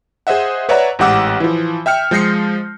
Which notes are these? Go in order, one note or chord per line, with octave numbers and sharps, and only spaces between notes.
G#4 C5 D#5 E5 F#5
B4 C#5 D5 E5 F#5 A#5
A1 G#2 G4 F#5 D6 E6
E3 F3
E5 G5 F6 C#7
F3 G#3 G6 A#6 C7 C#7